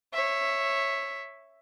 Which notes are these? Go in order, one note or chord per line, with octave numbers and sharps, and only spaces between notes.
C#5 E5